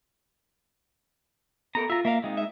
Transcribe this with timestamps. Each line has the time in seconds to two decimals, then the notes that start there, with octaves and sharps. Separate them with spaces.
1.75 B3 A4 A#4 A#5
1.90 F4 E5 A#5
2.05 A#3 A#4 E5 F5
2.24 C3 G#3 D#4
2.37 E5